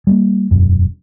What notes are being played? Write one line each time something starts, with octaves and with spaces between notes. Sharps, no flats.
G3 A3 A#3
E1 F#2